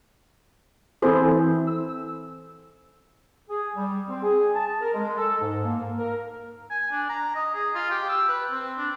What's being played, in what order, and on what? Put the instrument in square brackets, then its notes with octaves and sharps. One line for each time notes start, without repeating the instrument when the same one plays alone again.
[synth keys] E3 C4 E4 [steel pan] G#4 A4 C5
[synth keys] E6
[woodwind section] G#4
G3
C4
G#4
A5
A#4
G#3
A4
G#2
A#3
A#4
[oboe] G#5
D4
A#5
D#5
G#4
F4
G4
E6
B4
C4
D4